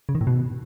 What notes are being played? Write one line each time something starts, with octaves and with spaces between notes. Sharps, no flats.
C#3
D#3
A2
B2